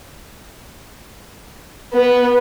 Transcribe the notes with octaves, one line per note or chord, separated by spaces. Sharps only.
B3